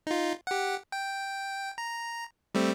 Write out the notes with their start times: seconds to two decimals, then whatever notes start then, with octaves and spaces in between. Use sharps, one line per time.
0.07 D#4 F4
0.47 G4 F#5
0.92 G5
1.78 A#5
2.55 G3 A3 C4